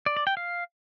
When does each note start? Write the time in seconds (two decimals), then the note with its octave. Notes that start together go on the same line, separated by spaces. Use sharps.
0.06 D5
0.17 D5
0.27 G5
0.37 F5